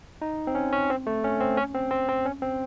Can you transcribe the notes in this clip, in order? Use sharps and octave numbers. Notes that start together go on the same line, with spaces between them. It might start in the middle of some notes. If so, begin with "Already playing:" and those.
D#4
C4
C#4
C#4
C4
A3
C#4
C4
C#4
C4
C4
C4
C#4
C4